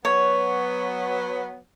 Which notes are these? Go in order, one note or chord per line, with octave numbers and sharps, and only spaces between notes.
F#3 B3 C#5